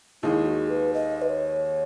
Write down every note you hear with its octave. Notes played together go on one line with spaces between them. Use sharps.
D#2 D#3 G#3 D#4 E4 G#4
F#4
B4
D#5
B4
C#5